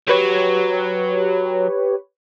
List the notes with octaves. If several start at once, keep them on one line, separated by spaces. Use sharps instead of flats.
F#3 G4 B4 C#5